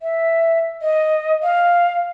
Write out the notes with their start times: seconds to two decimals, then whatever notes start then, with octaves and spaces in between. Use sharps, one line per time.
0.02 E5
0.82 D#5
1.43 F5